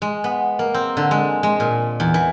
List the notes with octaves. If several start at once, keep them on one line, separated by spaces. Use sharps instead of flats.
G#3
B3
A#3
C4
D3
G#3
G#3
A#2
E2
E3